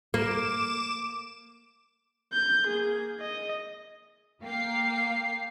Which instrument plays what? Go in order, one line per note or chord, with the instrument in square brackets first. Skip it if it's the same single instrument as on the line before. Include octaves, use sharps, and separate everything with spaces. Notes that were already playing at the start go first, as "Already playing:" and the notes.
[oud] A#3 [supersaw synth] D6 E7
[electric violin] G6
A#3 G#4
D#5
[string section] A#3 F5 G5 C7